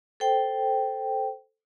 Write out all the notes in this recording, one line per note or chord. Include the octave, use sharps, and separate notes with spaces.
A4 C5 G5